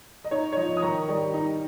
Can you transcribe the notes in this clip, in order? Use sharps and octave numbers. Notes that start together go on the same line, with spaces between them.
D#5
D#4 C#5
C#5
F3 D#5
D#6
D#3 A#5 C#6
G3
D#4